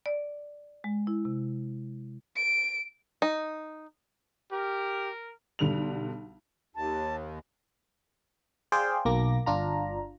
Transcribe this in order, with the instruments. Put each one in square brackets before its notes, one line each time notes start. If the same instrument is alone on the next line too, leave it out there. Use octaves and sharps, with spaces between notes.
[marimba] D5
G#3
E4
C3
[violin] D7
[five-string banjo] D#4
[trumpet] G4 [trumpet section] A#4
[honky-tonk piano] B1 D3 G3 F7
[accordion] D#2 [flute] A5
[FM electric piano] G#4 C5 D5 F5 G5
B1 A#3 D6 A#6
G1 D4 F4 A#5